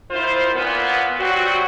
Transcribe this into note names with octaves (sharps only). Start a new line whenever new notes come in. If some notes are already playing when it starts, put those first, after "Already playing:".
D#3 E4 F4 C5
A#2 B3
F#3 G3 C4 F#4